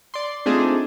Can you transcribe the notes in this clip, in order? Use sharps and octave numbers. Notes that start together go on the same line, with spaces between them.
D5 C6
A3 C4 D4 D#4 F4 G#4